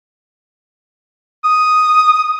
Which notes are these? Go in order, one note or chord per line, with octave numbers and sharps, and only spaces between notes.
D#6